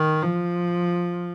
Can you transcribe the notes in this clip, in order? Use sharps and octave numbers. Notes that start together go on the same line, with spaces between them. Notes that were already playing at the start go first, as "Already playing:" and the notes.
Already playing: D#3
F3